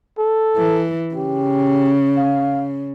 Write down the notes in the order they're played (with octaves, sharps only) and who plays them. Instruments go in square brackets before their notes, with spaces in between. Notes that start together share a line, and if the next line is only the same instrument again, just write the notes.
[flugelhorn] A4
[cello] E3
[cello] C#3 [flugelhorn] G4
[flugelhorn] F5